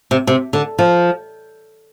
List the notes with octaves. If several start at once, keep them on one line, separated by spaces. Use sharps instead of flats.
C3
C3
D3
F3